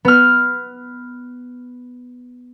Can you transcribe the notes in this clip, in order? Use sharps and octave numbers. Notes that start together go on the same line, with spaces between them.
B3 F6